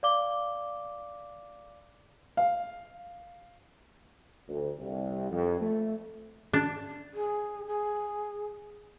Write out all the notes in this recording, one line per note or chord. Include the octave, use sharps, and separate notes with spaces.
D5 F5 D6 G7
F5
D2
C2
F2
A3
D4
G#4
G#4